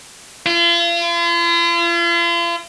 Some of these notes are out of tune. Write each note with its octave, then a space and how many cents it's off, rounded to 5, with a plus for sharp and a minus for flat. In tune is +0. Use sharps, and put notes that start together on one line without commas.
F4 -40